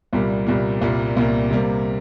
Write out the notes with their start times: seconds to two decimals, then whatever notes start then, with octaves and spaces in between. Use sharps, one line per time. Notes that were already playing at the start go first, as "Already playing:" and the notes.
0.13 C2 A#2 G3 A#3
0.47 C2 A#2 G3 A#3
0.81 C2 A#2 G3 A#3
1.17 C2 A#2 G3 A#3
1.51 C3 G3 A#3